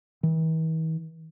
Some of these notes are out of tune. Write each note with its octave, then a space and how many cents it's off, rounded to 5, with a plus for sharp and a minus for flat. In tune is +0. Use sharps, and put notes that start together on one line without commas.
E3 -45